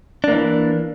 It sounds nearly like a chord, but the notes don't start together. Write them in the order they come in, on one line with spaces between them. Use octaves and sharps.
D4 A#3 E3